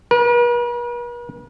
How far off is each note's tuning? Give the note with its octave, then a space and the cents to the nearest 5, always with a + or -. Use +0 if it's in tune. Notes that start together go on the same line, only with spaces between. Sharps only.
B4 -45